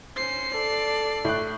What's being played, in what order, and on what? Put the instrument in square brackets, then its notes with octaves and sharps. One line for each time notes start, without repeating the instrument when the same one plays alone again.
[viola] C#4 [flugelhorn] C5 [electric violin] C7
[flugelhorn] A4 [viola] D5
[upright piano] A2 F#6